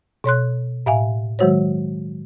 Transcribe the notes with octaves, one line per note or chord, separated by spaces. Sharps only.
B2 C#5 C6 F#6
A2 E5 F5 G#5
D#3 F#3 G#3 F#4 C5 C#5